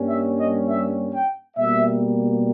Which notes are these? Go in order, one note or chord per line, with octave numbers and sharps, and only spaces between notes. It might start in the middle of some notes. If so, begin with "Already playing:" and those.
Already playing: G2 G3 A#3 C#4
E5
D#5
E5
G5
B2 G3 A#3 E5